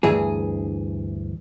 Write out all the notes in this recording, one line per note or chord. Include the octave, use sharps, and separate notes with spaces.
D2 G2 E3 G#4